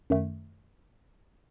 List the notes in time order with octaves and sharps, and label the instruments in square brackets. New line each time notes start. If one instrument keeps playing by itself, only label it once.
[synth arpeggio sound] F#2 D#3 A3